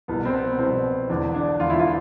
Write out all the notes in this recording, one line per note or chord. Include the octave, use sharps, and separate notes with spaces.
C2 B2 B3
C4
B3
C2 B2 C4
E1 E2 D3 D4
D4
E1 E2 D3 F4
E4
F4